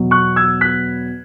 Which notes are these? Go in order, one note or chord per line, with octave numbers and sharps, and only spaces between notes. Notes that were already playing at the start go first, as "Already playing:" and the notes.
Already playing: E2 B2 F#3
C#6 F#6
E6 G#6
F#6 B6